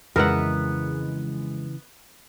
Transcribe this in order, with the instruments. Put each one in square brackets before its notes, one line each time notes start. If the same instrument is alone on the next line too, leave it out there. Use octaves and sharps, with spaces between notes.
[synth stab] F2 G#3 [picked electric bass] C#3 E3 [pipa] B3 [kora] A#4 E5 F#5